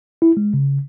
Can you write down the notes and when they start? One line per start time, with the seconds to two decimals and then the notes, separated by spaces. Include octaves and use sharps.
0.22 E4
0.37 G#3
0.54 C#3